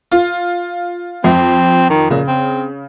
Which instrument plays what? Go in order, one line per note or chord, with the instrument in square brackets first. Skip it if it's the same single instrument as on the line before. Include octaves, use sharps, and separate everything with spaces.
[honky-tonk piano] F4
[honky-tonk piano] F2 [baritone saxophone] C4
[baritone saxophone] D#3
[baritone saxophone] A#2 [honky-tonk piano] C#3
[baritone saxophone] C4